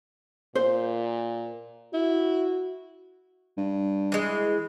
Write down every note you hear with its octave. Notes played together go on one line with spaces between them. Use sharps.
A#2 C5
E4 F#4
G2
E3 G#3